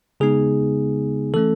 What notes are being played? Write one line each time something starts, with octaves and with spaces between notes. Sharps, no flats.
C#3 G#3 B3 D#4 G#4
E3 A3 C#4 A4